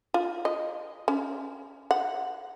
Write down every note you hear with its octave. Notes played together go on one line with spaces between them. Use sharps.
F4
D#5
C#4
F#5